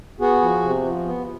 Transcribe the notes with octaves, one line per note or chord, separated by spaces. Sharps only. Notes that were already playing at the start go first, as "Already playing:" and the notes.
B3 F#4 G#4
F3
C3
F3
B3